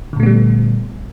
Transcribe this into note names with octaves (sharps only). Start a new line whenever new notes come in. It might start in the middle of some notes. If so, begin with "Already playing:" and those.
A#2 D3 G3 A3 B3